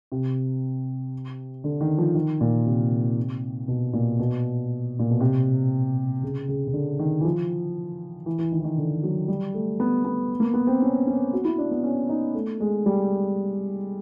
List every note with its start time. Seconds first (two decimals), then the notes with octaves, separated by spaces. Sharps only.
0.12 C3
1.64 D3
1.81 D#3
1.98 F3
2.15 D#3
2.41 A#2
2.66 C3
3.68 B2
3.93 A#2
4.20 B2
4.99 A#2
5.11 B2
5.20 C3
6.23 C#3
6.48 C#3
6.68 C#3
6.73 D3
6.99 D#3
7.21 E3
7.25 F3
8.26 E3
8.39 E3
8.52 D#3
8.60 E3
8.64 D#3
8.78 D3
9.03 F#3
9.28 G3
9.54 A3
9.80 B3
10.05 B3
10.40 A#3
10.54 B3
10.67 C4
10.82 C#4
11.07 C#4
11.33 F#4
11.45 E4
11.58 D4
11.71 B3
11.84 C#4
12.09 D#4
12.34 A3
12.60 G#3
12.86 G3